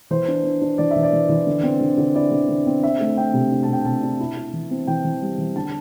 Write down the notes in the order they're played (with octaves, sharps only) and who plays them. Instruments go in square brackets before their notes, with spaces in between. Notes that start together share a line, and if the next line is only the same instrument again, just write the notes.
[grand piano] E3 C5
D4
D4
D4
E3 D5
E5
E3
D5
E3
E3
D3
C4
D3
D3
E4 D5
D3
D3
C4
D4 E5
A3
D4 G5
C3
D4
A5
C3 G5
C3 A5
D4
E4
E4
E3
C4
E3 G5
E3
G3
E3
D3 A5